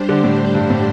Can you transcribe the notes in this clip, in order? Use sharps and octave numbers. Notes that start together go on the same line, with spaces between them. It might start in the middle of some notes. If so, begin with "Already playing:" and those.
Already playing: G3 D4 G4 C5
D3
A2
G2
A2